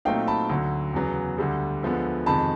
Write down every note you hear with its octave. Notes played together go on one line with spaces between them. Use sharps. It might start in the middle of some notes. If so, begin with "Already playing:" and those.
A#2 F#3 A3 C4 D#4 F5 G5
A5 B5
D2 D3 F#3
E2 C#3 F#3 B3
D2 D3 G3
D2 D3 F3 G#3 B3
F2 C3 D#3 G#3 A5 B5